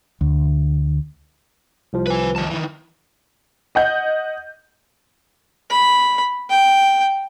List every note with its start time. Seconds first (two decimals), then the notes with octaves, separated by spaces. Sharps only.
0.21 D2
1.93 C2 F3
2.07 B4 G#5
2.36 F#2 D#3 A5
2.51 D#3 E3
3.75 D#5 F#5 G6
5.71 B5
6.50 G5